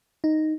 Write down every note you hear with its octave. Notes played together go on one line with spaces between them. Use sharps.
D#4